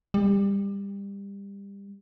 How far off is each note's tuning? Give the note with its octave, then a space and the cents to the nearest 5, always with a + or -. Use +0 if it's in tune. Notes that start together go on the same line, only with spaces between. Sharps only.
G3 +25